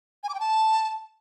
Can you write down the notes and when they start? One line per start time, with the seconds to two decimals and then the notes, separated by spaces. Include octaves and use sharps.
0.24 G#5
0.29 D6
0.35 G5
0.40 A5